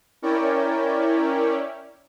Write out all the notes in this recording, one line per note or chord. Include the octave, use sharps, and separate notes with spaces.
C#4 E4 A#4 C#5 D5 G5